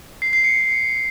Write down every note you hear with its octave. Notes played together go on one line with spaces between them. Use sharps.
C7
C7
C#7